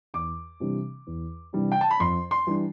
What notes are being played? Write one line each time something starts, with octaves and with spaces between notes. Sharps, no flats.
E2 D6
C3 E3 G3 D4
E2
C3 E3 G3 D4
G5
A5
B5
F2 C6
C6
E3 G3 D4